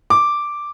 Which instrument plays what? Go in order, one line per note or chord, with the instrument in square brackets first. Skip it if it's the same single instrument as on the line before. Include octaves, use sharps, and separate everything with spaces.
[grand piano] D6